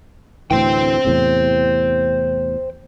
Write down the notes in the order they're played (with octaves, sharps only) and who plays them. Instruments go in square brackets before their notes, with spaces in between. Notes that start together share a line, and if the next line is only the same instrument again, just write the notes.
[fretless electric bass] D2 A2 E3 [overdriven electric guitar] C5 G5
[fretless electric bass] E2 A2 C3